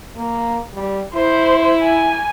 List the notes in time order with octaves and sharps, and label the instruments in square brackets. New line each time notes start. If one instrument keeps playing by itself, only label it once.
[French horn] A#3
G3
[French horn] E4 [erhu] C5
[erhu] G#5